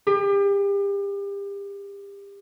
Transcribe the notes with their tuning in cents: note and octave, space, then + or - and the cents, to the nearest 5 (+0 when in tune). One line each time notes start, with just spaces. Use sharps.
G4 +35